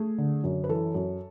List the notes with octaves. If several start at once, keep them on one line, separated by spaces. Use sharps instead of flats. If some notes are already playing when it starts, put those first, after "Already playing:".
Already playing: A3 G#4
D3
F#2
B4
E3 A4
F#2